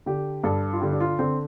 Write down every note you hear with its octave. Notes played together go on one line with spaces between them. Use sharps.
D3 G4
G2 A4
F4
D3 G4
D4
F4
D3 C4